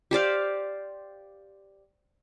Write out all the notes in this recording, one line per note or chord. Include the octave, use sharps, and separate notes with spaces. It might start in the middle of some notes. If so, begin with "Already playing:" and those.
G4 C5 D5 F5